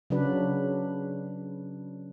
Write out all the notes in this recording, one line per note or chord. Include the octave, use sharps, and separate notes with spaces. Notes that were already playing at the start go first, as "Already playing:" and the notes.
C#3 F#3 D4 B4